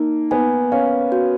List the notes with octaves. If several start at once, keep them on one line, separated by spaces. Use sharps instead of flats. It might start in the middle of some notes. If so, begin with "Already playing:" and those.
Already playing: A#3 D#4
B3 G#5
C#4 F5
F#4